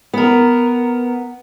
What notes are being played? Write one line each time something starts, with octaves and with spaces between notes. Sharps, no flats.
B3 A#4